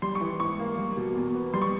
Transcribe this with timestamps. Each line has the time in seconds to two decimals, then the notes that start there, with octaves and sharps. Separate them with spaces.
0.02 G3 C6
0.15 C#6
0.21 E3
0.40 G#2 C#6
0.59 A#3
0.78 G3
0.97 B2
1.16 E2
1.35 B3
1.54 G3 C6
1.62 C#6